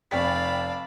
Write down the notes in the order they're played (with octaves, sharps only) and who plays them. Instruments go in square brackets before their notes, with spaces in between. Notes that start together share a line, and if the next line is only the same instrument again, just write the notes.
[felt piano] F1 G5 B6 [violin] D5 A5 [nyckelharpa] F5 B5